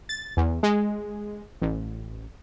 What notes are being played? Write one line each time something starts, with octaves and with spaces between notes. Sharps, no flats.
A6
E2
G#3
A1